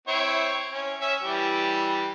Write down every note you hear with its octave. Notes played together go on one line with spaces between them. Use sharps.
C4 E4 C#5
C#4
C#4 E5
E3 G3 G4